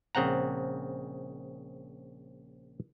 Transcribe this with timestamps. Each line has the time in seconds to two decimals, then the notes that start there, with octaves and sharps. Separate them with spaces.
0.15 A#1 C#3 C4 F#5 A#5